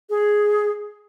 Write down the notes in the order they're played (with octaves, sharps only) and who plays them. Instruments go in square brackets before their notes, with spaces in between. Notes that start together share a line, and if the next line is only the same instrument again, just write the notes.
[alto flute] G#4